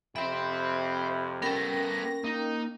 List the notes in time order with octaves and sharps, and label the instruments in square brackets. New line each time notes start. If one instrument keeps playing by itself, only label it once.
[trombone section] F2 C3 [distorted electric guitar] C5 G5 [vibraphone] E5 [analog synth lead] B5
[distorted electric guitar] B3 A4 [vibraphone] C#4 A#4 G5 [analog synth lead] A#6
[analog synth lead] A#3 [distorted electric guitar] D#4